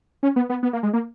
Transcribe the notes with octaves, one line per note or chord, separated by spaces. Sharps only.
C#4
B3
B3
B3
A#3
G#3
A#3